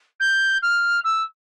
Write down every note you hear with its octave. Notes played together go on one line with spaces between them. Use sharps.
G6
F6
E6